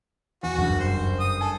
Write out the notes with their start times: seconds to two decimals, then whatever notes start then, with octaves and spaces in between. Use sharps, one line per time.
0.43 E2 F#4
0.58 F#1 G2
0.80 C5
1.20 D#6
1.41 A4 G#5